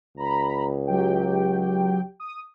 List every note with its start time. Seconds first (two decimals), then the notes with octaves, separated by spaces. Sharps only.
0.17 C#2 A#5 B5
0.87 F#3 G4 G5
2.20 D#6